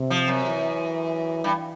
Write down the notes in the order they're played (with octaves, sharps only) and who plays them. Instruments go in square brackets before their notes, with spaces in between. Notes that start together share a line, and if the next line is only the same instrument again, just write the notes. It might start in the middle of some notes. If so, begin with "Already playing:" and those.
Already playing: [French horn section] C3
[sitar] F3
F#2
[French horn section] E3
[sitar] G2